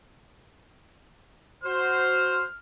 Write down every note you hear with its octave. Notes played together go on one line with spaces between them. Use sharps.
F#4 C5 F6